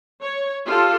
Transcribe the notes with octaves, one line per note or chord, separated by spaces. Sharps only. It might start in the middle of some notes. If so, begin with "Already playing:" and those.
C#5
F4 G4 A4